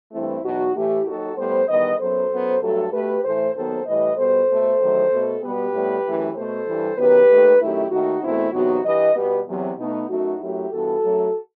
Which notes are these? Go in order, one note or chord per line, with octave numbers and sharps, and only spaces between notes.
G2 E3 A3 C4 E4
E2 B2 F#3 D#4 F#4
A2 E3 A3 E4 G4
D#2 D#3 F#3 F#4 A4
A2 G3 B3 A4 C5
E2 D#3 G3 B3 B4 D#5
F#2 F#3 B3 A4 C5
F#2 F#3 B3
G2 F#3 A3 F#4 A4
B2 A3 G4 B4
A2 E3 A3 A4 C5
D#2 D#3 F#3 B3 A4 C5
A2 E3 G3 B4 D#5
B2 G3 B3 A4 C5
B2 A3
E2 D#3 F#3 A3
B2 A3
B2 G3 B3 G4 B4
A2 G3 B3
F#2 E3 A3
B2 A3 A4 C5
G2 E3 G3
F#2 D#3 F#3 B3 G4 B4
D#2 D#3 A3
F#2 D#3 A3 E4 G4
D#2 D#3 A3 D#4 F#4
E2 B2 A3 C4 E4
E2 C3 F#3 B3 D#4 F#4
G2 E3 G3 B4 D#5
B2 G3 B3
E2 C3 F#3
B2 A3 B3 D#4
F#2 F#3 A3 D#4 F#4
F#2 F#3 A3 E4 G4
G2 E3 B3 F#4 A4
F#2 F#3 A3